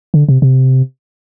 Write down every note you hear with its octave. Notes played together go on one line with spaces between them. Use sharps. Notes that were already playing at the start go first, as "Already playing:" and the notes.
D3
C3
C3